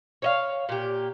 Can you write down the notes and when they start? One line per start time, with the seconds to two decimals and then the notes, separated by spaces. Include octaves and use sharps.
0.22 C#5 D#5 F5
0.69 A#2 G4